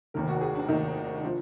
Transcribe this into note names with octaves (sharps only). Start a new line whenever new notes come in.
F1 D#2 D#3 A#4
F#4
G#4
D4
F1 D#2 D#3 D#4
F3 D4